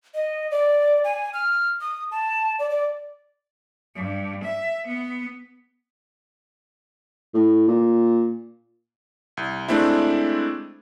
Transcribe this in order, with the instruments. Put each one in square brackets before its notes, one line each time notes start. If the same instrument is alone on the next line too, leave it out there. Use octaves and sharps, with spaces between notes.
[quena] D#5
D5
G#5
F6
D#6
A5
D5
D5
[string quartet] G2
E5
B3
[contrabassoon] A2
A#2
[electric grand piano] C2
G#3 A3 C4 D4 E4